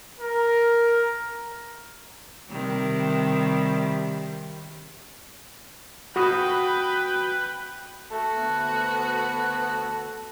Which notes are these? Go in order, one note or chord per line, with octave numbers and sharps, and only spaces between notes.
A#4
C3 D#3 G3
F#4 B4 G5 B5 D#6
A3 F#4 A4
D2 B3